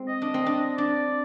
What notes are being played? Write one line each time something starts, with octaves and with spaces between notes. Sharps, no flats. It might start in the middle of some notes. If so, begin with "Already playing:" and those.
Already playing: G#3 C4
D#5
D4
C4
D4
D4 D5